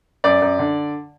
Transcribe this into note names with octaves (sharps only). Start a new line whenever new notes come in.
F#2 D5
F#2
D3